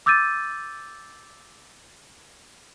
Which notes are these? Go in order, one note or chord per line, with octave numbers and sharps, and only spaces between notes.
D6 E6 G6 A6 D#7